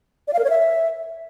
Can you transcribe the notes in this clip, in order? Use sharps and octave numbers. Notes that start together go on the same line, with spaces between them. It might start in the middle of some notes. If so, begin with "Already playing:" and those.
D5
F5
A#4
C#5
E5